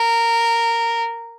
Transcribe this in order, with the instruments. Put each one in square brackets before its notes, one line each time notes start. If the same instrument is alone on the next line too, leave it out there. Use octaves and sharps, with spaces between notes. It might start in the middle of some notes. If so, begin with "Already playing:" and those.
Already playing: [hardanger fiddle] A#4